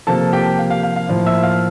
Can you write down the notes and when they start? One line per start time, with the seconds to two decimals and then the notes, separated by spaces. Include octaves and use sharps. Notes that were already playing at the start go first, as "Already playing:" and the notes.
0.07 C3 F3 A#3 A4 A5
0.33 G4 G5
0.59 F5
0.70 F5
0.83 F5
0.96 F5
1.09 A2 F3 A#3
1.26 E5 E6
1.43 F5 F6